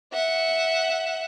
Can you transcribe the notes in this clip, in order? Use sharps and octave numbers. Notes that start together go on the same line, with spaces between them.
E5 F#5